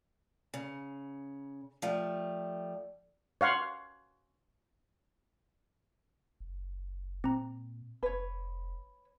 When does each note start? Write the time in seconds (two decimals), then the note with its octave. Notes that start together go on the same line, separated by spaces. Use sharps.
0.54 C#3
1.82 F3 G3 A3
3.41 C#5 F5 F#5 C6
6.40 F#1
7.24 A#2 C4 A#5
8.03 F1 B4 C#5